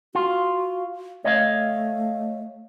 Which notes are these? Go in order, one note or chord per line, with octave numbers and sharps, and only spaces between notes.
F4 F#4
A3 C#5 D#5 F5